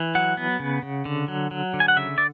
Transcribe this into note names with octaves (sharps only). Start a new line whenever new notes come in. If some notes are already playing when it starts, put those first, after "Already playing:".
Already playing: E3
F#3 F#5
B3
C#3
C#3
D3
F#3
F#3
D3
G#5
F#5
C#3 E5
D5